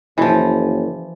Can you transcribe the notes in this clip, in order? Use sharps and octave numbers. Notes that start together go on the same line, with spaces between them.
F#1 E3 F3